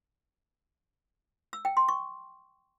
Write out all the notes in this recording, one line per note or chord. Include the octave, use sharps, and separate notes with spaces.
E6
G5
C6
C#6